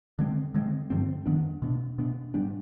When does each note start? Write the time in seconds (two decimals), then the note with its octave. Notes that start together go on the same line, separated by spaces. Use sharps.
0.19 D3 G#3 C4
0.54 D3 G#3 C4
0.90 G2 D3 F3 C4
1.26 F2 D#3 B3 D4
1.62 B2 B3 D4
1.98 B2 B3 D4
2.34 G#2 G3 B3 D4